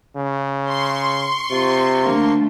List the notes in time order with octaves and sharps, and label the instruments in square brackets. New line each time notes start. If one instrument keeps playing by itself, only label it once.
[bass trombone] C#3
[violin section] C6 C#6
[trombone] C3 [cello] F4
[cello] D3 A3 [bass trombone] A#3